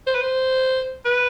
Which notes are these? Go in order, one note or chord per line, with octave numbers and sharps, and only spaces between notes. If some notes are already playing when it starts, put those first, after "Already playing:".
C5
B4
C5
B4